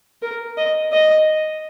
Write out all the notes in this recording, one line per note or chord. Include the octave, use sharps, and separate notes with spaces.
A#4
D#5
D#5